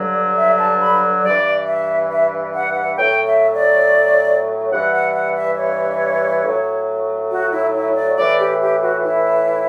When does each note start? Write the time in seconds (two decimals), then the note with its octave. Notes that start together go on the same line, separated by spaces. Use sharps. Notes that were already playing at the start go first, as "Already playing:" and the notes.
Already playing: G2 D3 F#3
0.38 E5
0.59 A5
0.81 B5
1.24 G2 E3 D5
1.68 E5
2.11 E5
2.55 F#5
2.76 F#5
2.98 A2 F#3 G5
3.27 E5
3.56 D5
4.71 G2 E3 F#5
4.93 F#5
5.15 F#5
5.36 E5
5.58 C#5
6.44 A2 F#3
7.31 F#4
7.53 E4
7.74 E4
7.96 D5
8.18 A2 E3 D5
8.40 G4
8.62 G4
8.83 F#4
9.04 E4